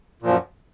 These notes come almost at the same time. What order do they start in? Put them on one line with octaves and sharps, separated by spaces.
A#2 F3 F#2